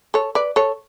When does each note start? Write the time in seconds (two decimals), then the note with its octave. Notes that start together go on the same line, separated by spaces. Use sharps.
0.14 A4 C#5
0.35 B4 D5
0.56 A4 C#5